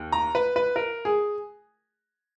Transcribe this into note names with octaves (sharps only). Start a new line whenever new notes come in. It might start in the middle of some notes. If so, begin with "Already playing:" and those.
Already playing: D#2
A#5
B4
B4
A#4
G#4